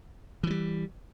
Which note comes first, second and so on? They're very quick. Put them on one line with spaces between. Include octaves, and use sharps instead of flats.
E3 F3 G3